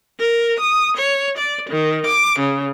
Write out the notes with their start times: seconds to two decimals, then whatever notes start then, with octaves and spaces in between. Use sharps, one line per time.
0.19 A#4
0.59 D#6
0.98 C#5
1.37 D5
1.70 D#3
2.07 D6
2.40 C#3